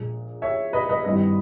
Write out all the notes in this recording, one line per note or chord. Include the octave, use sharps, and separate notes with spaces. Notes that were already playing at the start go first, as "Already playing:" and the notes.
Already playing: A#1 A#2 G#3
C#5 E5
B4 D#5
B4 D#5
G#1 G2 E3 G3 B4 D#5